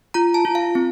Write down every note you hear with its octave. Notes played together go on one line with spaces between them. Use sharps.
F4 A#5
A5
F4
F5
C4